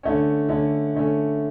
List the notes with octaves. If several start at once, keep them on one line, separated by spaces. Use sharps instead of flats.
D3 A3 C#4
D3 A3 C#4
D3 A3 C#4